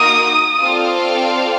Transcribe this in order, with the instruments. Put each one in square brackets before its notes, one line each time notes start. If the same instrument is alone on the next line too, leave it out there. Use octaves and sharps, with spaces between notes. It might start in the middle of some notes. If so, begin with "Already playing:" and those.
Already playing: [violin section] A#3 D#4 F#4 A#4 [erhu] D#6
[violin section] C4 F4 A4 D5 F5